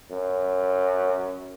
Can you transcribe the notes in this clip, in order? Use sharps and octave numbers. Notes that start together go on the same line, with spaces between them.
F#2